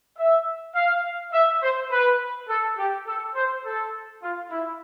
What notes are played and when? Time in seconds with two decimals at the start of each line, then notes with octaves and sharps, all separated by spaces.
0.17 E5
0.75 F5
1.32 E5
1.61 C5
1.90 B4
2.48 A4
2.77 G4
3.06 A4
3.34 C5
3.64 A4
4.21 F4
4.51 E4